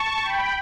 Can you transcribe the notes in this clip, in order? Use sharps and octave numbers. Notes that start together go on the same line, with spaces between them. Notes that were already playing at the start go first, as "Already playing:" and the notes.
Already playing: A5 C#6
G5 B5